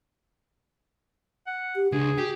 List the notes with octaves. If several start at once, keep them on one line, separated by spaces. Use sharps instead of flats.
F#5
G4
C#2 D4 G#4
F#4 G4